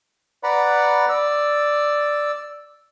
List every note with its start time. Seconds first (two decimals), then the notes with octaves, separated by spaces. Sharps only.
0.43 B4 D5 F#5 A#5 B5
1.09 D5 E6